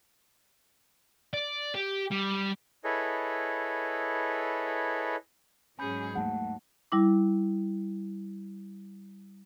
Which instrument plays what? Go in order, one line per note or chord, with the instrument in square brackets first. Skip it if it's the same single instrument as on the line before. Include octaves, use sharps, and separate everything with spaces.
[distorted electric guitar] D5
G4
G3
[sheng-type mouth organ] E4 G#4 A4 B4 C#5 D#5
[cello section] G#2 F#3 [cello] C#4 G#4 [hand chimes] G#5 B5 G6
[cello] D#2 [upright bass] G#3 A3 [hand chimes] F#5 A5
[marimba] G3 E4 D6